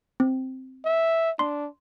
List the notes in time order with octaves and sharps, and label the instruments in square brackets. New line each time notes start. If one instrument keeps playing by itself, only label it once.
[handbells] C4
[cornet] E5
[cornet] D4 [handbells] C6